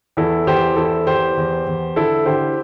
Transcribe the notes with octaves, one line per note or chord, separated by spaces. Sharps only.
E2 E4 A4
E2 G4 C5
E2 E4 A4
E2 G4 C5
E2
E2
D3 E4 A4
D3 G4 C5